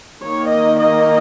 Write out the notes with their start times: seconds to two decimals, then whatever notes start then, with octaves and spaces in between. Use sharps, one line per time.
0.23 D#3 A#3 D#4 C#5
0.52 D#5
0.80 D#5